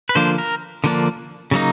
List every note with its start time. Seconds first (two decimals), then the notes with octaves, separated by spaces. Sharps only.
0.09 B4
0.15 D3 F3 A#3 D4 C5
0.38 A#4
0.84 D3 F3 A#3 D4
1.51 C#3 F#3 A#3 D#4